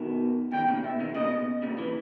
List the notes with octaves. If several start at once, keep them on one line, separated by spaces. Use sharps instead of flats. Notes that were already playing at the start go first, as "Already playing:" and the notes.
Already playing: B2 D#3
B2 D#3 G5
A#2 C#3
B2 E5
B2 D#3
A#2 C#3 D#5
B2
A#2 C#3
C#3 E3